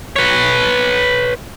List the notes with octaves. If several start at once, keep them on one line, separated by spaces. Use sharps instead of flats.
B4 C#5